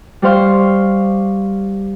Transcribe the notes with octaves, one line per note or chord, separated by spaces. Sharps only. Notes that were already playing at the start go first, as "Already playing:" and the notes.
G3 G4 C5 F5 C#6